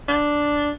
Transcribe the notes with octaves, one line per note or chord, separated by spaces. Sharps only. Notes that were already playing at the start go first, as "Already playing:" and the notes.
D4